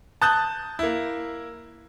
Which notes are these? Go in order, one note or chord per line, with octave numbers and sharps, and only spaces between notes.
A5 D#6 F#6 G6 A6
A#3 E4